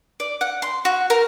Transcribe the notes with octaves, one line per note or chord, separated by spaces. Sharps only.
D5
F#5
C6
F#4
A#4